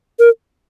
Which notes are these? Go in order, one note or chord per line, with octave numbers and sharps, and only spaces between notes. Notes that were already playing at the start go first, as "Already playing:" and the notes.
A#4